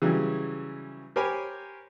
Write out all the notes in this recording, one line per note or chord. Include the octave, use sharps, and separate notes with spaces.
C#3 E3 F#3 G3
G4 A#4 C5 C#5 G#5 B5